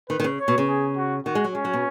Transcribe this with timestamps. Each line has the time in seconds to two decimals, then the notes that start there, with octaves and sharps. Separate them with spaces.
0.09 D#3 B4
0.20 D#3
0.24 C#3
0.38 C#5
0.48 B2
0.58 C#3
0.67 G#4
0.96 F#4
1.25 D#3 F#4
1.35 G#3
1.44 F#3
1.54 G#3 C#4
1.65 F#3
1.74 B2